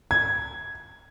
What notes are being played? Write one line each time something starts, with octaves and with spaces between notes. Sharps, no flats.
G#6